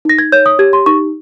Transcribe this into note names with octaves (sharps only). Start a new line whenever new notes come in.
D#4 A#6
G#6
C#5 G6
D#6
G4 G#6
C6
D#4 C#6